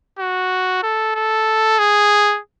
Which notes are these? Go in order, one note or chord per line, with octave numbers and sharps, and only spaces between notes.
F#4
A4
A4
G#4